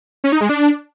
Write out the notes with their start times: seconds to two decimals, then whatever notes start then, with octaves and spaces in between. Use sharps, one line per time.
0.24 C#4
0.32 D#4
0.41 G#3
0.49 D4